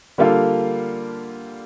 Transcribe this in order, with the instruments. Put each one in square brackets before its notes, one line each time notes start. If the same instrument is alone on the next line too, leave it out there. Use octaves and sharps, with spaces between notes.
[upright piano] D3 G3 A#3 F4 A4